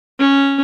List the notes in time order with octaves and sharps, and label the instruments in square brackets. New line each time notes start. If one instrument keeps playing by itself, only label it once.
[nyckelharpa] C#4